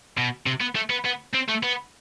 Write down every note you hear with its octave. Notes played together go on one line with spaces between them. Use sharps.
B2
C3
B3
A3
B3
B3
C4
A3
B3